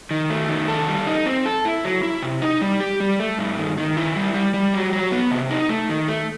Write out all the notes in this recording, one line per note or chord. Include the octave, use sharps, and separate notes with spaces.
D#3
A3
D#3
A4
G3
D#4
C4
A4
E4
F#3
E4
C3
D#4
G3
G4
G3
A3
G2
D#3
D#3
E4
G3
G3
G3
F#3
F#3
B3
C3
D#4
A3
D#3
A3